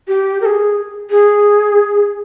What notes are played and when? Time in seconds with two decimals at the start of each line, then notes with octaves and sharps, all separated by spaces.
0.08 G4
0.42 A#4
0.46 G#4
1.10 G#4